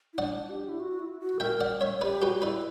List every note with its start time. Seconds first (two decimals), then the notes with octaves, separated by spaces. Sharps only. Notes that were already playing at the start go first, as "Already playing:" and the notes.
0.13 E4
0.18 D4 D5 F#5
0.49 G4
0.69 E4
0.79 F#4
1.00 E4
1.20 F#4
1.40 A#4 E5 G5
1.61 D5 F#5
1.81 C#5 E5
2.01 G4 B4 D5
2.22 F#4 G4 B4
2.42 E4 B4 D5